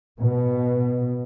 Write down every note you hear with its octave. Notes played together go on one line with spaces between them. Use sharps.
B2